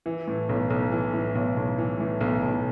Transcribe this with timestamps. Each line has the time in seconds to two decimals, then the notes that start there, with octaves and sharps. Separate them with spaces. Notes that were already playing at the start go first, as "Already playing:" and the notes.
0.06 E3
0.27 A2
0.49 B1
0.70 B1
0.92 E3
1.13 A2
1.35 B1
1.57 B1
1.78 E3
2.00 A2
2.21 B1
2.42 B1